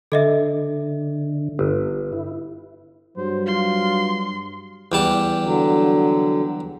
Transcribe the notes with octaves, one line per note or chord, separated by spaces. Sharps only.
D3 A4 D#5 E5
G1
E4
G2 F#3 C5
F4 C6
E2 G3 A5
D3 F#3